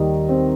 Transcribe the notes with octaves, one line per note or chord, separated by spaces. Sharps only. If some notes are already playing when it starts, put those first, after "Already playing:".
Already playing: D#2 D#3 G3 D#4 D#5
C4 C5